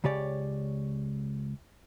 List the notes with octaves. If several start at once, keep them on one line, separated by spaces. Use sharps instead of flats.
C#2 C#3 G4 C#5 D5